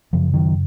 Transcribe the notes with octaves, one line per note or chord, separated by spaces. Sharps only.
F#2 C#3 F3
D#3 F#3